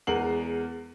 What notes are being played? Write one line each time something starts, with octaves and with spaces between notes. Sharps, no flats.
E2 G#3 A#4 F#5 C7 F#7